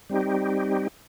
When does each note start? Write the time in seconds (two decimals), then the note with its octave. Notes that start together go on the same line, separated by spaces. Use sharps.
0.10 G3 C4 D#4 G4